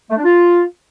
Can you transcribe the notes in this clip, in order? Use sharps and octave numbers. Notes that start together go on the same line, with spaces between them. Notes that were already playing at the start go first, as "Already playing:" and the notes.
A3
D4
F4